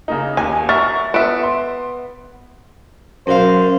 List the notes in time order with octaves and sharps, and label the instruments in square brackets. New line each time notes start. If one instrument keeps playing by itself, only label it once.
[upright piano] C#3 A#3 D#4
[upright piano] D#2 [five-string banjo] G#5
[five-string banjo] A#4 E5 [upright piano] F#5 C#6 A6
[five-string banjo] B3 E5 [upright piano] D7 E7
[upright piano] C6
[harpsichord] F#2 F5 [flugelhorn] C5